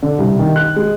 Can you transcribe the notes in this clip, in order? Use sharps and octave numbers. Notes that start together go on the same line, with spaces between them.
D3
C2
D#3
F#6
G#3